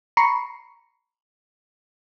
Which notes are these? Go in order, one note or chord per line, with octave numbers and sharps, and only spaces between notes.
A#5 B5 C#6 C7 C#7